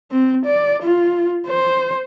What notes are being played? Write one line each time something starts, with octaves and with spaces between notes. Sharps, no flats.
C4
D5
F4
C5